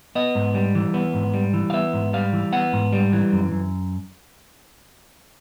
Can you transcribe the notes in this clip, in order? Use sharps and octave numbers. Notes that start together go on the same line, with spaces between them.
B3 D#5
G#2
G3
E3
B3
G#2
G3
E3
F5
B3 E5
G#2
G3 F5
E3
B3 F#5
G#2
G3
E3
F#2
F#2